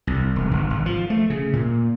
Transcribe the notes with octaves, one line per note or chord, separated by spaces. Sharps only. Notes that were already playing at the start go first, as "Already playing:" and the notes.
C2
E1
G1
G#1
F3
A3
C#3
A#2